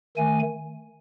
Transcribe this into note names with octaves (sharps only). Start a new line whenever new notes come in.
D#3 A3 G#5